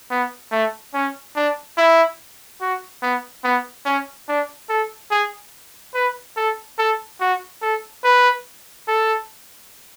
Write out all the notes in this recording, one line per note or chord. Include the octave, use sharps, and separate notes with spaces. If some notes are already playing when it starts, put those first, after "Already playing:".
B3
A3
C#4
D4
E4
F#4
B3
B3
C#4
D4
A4
G#4
B4
A4
A4
F#4
A4
B4
A4